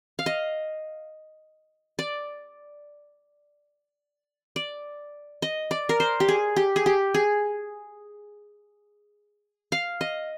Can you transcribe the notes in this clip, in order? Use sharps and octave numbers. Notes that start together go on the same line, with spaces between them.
F5
D#5
D5
D5
D#5
D5
A#4
C5
G4
G#4
G4
G#4
G4
G#4
F5
D#5